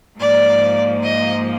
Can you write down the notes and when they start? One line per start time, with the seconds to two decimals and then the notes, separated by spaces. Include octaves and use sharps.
0.19 G#2 F3 A#3 D5
1.04 D#5